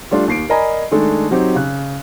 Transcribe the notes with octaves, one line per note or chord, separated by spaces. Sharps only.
G3 A3 D4 F4
D#2 C7 D7
A#4 D5 D#5 G#5 A#5 B5
D#3 G#3 A3 D4 A4
F#3 C4 D#4 G4
C#3 F#6